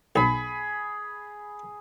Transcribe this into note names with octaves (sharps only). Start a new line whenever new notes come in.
B1 G#4 B5